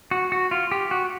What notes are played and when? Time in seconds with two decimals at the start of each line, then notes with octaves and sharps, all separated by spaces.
0.11 F#4
0.32 F#4
0.51 F4
0.71 G4
0.91 F#4